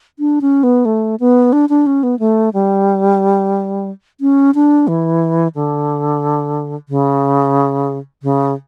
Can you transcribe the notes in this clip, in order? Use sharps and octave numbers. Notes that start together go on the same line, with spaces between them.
D4
C#4
B3
A3
B3
D4
D4
C#4
B3
A3
G3
C#4
D4
E3
D3
C#3
C#3